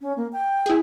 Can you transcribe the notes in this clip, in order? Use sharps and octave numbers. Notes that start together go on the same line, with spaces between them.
C#4
A#3
G5
E4 G#4